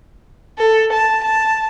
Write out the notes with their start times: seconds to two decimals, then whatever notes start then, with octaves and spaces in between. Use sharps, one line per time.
0.58 A4
0.93 A5
1.24 A5